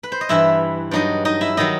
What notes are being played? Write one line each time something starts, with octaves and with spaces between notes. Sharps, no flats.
B4
C5
D#5
G2 E3 E4 E5
G2 F#3 D#4 D#5
D#4 D#5
E4 E5
D#3 F#3 D#4 D#5